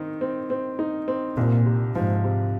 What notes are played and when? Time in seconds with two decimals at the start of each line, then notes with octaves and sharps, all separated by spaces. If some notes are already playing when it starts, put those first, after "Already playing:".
Already playing: D#3 C4 D#4
0.21 C4
0.50 C4
0.79 D#4
1.08 C4
1.37 C2 A#2
1.66 C3
1.95 G#2 F3
2.24 C3